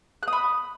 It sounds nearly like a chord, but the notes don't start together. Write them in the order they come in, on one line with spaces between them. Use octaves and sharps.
F#6 D#6 B5